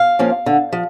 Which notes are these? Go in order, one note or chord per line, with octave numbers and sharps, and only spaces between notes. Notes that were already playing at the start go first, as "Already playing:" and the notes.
Already playing: F5
F3 A#3 C#4
D3
F3